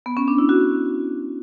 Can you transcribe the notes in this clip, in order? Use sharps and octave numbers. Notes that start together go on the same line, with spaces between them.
B3
C#4
D4
E4
F#4